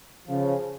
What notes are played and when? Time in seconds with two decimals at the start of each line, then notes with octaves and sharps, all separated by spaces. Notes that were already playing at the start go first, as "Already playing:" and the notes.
0.27 C#3 F3